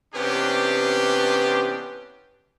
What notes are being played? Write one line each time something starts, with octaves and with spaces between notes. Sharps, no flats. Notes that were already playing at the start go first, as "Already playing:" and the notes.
C3 E3 B3 C#4 D4 G4